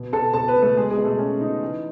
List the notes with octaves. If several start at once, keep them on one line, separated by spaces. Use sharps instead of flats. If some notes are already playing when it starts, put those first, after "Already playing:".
Already playing: B2
B2 A4 A5
B2 A4 A5
B3 B4
B2
A3 A4
B2 G#3 G#4
G#3 G#4
B2
A3 A4
B2 C#4
B2 D#4
E3